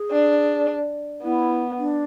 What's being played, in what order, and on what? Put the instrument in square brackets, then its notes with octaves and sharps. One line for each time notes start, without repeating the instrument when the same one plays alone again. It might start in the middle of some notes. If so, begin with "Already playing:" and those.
Already playing: [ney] G#4
[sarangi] D4
[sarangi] B3 [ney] E4
[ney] D4